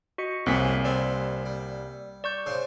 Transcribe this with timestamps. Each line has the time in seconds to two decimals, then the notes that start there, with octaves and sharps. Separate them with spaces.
0.18 F#4 D#5 C#7
0.46 C2 F2 G#2 C#3 A#3 C4 G#5 B6
0.85 D3 G3 C4 D5
1.46 G3
2.24 D5 C#6 G6
2.46 G#2 C#3 C5